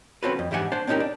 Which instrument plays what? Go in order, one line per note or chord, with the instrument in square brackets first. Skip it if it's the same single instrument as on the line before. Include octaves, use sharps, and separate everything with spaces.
[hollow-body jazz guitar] C4 C#4 F4 F#4 A4 B4
F2
G#2 E3 G4 E5 F#5 G#5
D4 C5 A5
C4 C#4 D#4 F#4 G4 A#4
D4